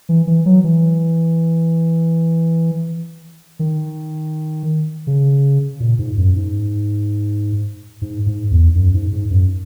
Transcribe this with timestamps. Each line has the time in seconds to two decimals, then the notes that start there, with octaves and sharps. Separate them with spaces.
0.09 E3
0.27 E3
0.46 F#3
0.64 E3
3.59 D#3
5.07 C#3
5.80 A#2
5.99 G#2
6.17 F#2
6.36 G#2
8.02 G#2
8.26 G#2
8.51 E2
8.75 F#2
8.94 G#2
9.13 G#2
9.31 F#2